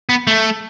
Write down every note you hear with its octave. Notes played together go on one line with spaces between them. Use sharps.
B3
A3